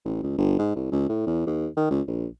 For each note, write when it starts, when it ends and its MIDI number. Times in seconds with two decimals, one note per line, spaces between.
0.05 0.22 33
0.23 0.37 37
0.38 0.57 31
0.59 0.74 44
0.76 0.89 36
0.92 1.07 37
1.09 1.24 45
1.27 1.43 40
1.47 1.68 39
1.77 1.89 51
1.90 2.01 37
2.07 2.27 34